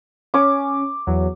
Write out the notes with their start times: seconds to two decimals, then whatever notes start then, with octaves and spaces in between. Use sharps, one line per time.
0.34 C#4 D6
1.07 E2 F#3